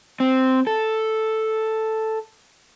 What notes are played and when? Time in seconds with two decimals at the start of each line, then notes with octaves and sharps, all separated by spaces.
0.20 C4
0.67 A4